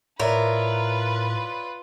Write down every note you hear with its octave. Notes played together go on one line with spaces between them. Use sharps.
A2 F4 A#4 B4 C#5 D5 E5